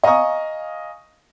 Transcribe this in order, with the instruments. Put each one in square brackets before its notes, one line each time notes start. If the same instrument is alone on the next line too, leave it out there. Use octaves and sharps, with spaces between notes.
[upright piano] D#5 F5 G#5 A#5 C#6 D#6